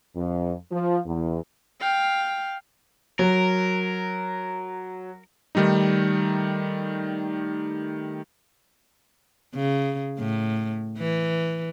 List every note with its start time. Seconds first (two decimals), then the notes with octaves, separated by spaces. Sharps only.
0.17 F2
0.72 F3
1.06 E2
1.80 F5 G5
3.19 F#3 A#4
5.55 D#3 G3 A3 D#4
9.55 C#3
10.19 A2
10.98 E3